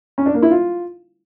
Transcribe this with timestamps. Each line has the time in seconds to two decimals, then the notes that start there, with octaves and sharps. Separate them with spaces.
0.18 C#4
0.26 D4
0.34 A#3
0.42 E4
0.51 F4